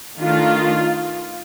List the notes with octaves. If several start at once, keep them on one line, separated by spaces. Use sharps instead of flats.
D#3 A3 D4 F4